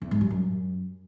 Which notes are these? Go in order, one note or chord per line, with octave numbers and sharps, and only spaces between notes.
E2
G#2
G3
F#2